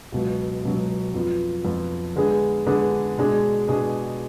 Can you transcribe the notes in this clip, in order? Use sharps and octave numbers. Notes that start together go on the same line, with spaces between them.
C#2 B2 F#3
C#2 B2 F#3
F2 F3 B3 F4
F2 F3 B3 F4
D3 G#3 B3 D4 G#4
D3 G#3 B3 D4 G#4
B2 G#3 D4 G#4
B2 G#3 D4 G#4